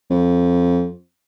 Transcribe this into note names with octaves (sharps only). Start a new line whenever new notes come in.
F2